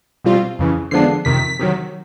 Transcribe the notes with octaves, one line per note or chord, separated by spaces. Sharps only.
B2 G3 C4 F4
F2 C#3 E3
D3 F3 G#3 B3 D4 C7
F2 C3 D#3 B6
C3 D#3 F#3